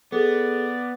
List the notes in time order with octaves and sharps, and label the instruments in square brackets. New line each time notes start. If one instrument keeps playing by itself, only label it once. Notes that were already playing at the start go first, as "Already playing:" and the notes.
[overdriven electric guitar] B3 [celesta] G#4 A4 [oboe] D5